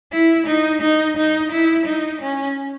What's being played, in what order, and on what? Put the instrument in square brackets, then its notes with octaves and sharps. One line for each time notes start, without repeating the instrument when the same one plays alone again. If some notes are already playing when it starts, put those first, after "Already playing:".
[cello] E4
D#4
D#4
D#4
E4
D#4
C#4